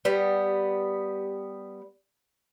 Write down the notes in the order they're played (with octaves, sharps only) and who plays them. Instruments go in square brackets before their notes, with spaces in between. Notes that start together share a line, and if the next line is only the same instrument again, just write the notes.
[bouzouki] G3 B3